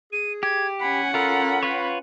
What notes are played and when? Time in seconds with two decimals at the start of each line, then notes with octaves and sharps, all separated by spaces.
0.13 G#4 D#7
0.43 G4 G#6
0.81 C#4 F#5 G#5 B5
1.14 F4 A4 A#4 B5
1.63 F4 B4 C#5